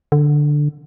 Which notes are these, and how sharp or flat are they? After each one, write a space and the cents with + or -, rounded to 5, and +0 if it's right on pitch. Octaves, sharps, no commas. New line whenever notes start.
D3 +5